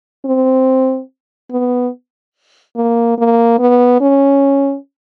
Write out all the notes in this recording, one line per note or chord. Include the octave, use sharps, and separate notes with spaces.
C4
B3
A#3
A#3
B3
C#4